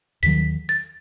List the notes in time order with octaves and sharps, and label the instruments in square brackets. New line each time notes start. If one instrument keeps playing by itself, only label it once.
[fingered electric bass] D#2 D#3 F#3 [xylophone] B6
[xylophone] A6